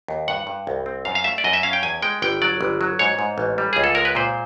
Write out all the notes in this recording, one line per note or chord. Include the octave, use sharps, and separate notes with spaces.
D#2
G2 F#5
G2
C2
C4
F#2 F5
F5
A3 E5
D5
F#2 D#5
E5
C#4 F5
G5
E2 G#5
G#3 G5
G1 G5
F#3 D5
G1
F#3
G#2 C#5
G#2
A1
G3
C#2 G#4
A4
G#3 A#4
B4
A#2 C5